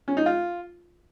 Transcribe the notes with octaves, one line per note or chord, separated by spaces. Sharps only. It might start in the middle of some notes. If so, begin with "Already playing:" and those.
C#4
D#4
F4